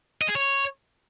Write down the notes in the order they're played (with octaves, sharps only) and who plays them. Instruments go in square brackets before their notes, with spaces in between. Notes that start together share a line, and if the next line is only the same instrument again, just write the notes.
[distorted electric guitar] D#5
G#4
C#5